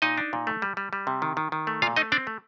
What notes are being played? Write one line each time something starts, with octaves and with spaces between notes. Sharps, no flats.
A#2 D#4 D#5
D4
A#2
A3
G3
G3
G3
C3
D#3
D#3
D#3
A3
A#2 F4 F5
A3 D#4 D#5
C4 D4 D5
A3